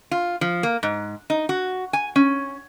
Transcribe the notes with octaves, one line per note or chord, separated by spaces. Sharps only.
F4
F3
A#3
G#2
D#4
F#4
G#5
C#4